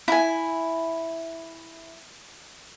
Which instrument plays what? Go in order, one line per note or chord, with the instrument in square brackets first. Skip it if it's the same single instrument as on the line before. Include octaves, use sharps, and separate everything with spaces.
[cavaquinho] E4 G#5